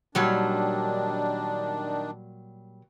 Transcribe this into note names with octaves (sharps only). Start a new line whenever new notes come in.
A#2 D#3 F#3 G3 D4